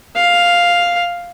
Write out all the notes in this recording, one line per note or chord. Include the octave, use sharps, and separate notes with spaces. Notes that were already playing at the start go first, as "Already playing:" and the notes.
F5